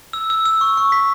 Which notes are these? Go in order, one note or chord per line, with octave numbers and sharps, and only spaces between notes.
E6
E6
E6
C#6
C#6
B6